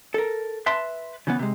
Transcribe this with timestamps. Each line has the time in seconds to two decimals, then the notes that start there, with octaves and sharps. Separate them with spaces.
0.14 A4 A#4
0.66 B4 E5 A5 C6
1.27 C#3 E3 B3
1.39 C3 G#3